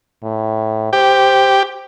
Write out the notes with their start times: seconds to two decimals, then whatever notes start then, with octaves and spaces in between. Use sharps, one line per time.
0.23 A2
0.93 G4 C5